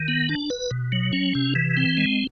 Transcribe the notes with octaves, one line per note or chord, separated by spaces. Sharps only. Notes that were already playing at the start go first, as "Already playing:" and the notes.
Already playing: D#3
B3
D4
B4
B2
F#3
C#4
C3
E3
C4
G#3